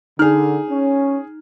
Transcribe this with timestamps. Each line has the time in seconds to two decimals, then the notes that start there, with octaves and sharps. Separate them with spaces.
0.19 D3 D#4 G#4 F6
0.70 C#4